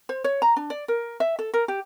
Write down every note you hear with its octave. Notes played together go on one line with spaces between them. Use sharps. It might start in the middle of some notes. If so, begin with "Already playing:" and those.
C5
C#5
A#5
D4
D5
A#4
E5
A4
A#4
G4